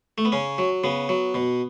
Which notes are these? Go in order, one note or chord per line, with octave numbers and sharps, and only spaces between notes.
A3
B3
C#3 C#4
F#3
C#3 B3
F#3
B2